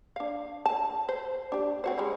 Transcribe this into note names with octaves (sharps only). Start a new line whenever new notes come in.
D4 F5
A5
C5
D4 G4
C4 F#4 C5
C#3 G3 G#3